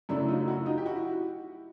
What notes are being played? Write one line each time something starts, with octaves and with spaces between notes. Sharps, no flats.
F#2 C#3 F#3 A3 D4 E4
D#4 F4
E4 F#4
D#4 F4
G4
E4 F#4